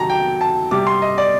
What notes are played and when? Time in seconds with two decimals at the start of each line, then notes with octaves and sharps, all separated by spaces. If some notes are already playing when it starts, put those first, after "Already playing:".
Already playing: C3 D#3 F#3 A5 A#5
0.10 G5
0.41 A5
0.71 C3 G3 D6
0.87 C6
1.02 D#5
1.18 D5